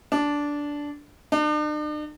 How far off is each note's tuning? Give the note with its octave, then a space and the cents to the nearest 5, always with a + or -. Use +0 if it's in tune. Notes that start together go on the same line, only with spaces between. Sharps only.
D4 -10
D4 +45